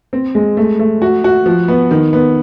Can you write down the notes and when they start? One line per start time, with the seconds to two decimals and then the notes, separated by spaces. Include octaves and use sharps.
0.13 C4
0.35 G#3
0.57 A3
0.79 A3
1.02 F#4
1.24 F#4
1.46 F3
1.68 B3
1.91 D#3
2.13 B3